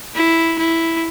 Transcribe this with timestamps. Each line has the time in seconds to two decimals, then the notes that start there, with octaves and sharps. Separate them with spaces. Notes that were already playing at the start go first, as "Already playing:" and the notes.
0.15 E4
0.59 E4